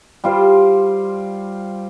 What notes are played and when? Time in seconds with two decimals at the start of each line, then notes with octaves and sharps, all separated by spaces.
0.24 G3 F4 C5